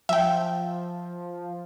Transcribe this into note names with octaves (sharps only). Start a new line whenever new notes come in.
F3 E5 G5